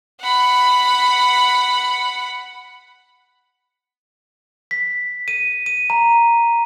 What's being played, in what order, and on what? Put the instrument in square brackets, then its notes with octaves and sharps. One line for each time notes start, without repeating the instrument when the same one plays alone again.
[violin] F#5 B5
[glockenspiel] B6
D#7
D#7
A#5